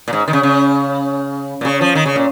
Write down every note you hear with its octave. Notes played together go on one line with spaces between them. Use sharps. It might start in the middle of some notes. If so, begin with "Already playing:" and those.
A#2
G#2
D#3
C#3
C#3
A#2
C#3
F3
D#3
C#3
A#2